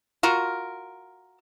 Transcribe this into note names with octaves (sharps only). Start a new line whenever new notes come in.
F4 F#4 A#4